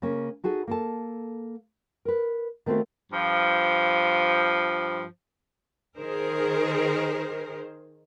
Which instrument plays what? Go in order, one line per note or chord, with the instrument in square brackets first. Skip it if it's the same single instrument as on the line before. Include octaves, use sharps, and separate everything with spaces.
[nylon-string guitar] C#3 A#3 C#4
D#4 F#4 G#4 A4
A#3 A4 A5
A#4 B4
D#3 A3 B3 C4 F#4 F5
[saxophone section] G2 F3
[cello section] D#3 G#4 A#4 C5